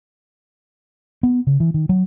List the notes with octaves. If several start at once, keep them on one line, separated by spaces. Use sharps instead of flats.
B3
C#3
E3
D#3
F#3